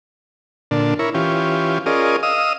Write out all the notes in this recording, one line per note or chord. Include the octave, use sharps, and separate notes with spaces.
A#2 D3 D4
E4 A#4 C#5
E3 C#4 F4 G4
C#4 F4 G#4 A#4 D5 D#5
D#5 F5 D#6 E6